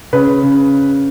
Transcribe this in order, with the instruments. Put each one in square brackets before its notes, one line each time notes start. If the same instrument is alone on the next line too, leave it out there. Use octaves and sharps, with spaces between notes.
[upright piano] C#3 B4
C#3
C#3